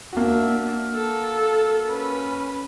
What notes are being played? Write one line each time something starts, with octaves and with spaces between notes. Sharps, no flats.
A#3 D4 F#4 E5
A4
C#4 B4